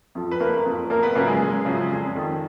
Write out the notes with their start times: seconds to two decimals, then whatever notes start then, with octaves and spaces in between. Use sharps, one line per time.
0.15 F2 F3
0.31 B4
0.40 F#1 A#3 A#4
0.65 F2 F3
0.90 F#1 A#3 A#4
1.02 B3 B4
1.15 F#2 C#3 F3 A#3 A#4
1.28 G#3 G#4
1.40 F#1
1.65 F#2 C#3 F3
1.90 F1
2.16 F2 D#3